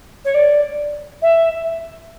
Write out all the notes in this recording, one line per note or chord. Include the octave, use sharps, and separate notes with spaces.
C#5
D5
E5